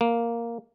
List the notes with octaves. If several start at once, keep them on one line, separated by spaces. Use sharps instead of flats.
A#3